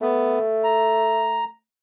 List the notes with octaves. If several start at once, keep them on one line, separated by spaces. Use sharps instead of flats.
A3 B3
A#5